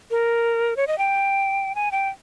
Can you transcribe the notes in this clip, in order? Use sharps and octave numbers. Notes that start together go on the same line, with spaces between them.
A#4
C#5
D#5
G5
G#5
G5